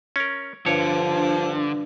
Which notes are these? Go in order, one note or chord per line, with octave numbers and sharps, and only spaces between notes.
C#4 A#4
G2 D3 F3 C#5